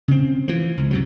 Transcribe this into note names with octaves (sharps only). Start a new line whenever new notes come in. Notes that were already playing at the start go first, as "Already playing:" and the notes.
C#3 C4
E3 F3
C#2
F#2 C3 F#3